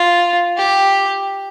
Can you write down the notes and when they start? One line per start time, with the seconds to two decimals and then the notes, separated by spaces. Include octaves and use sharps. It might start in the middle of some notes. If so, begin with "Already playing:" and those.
Already playing: F4
0.57 G4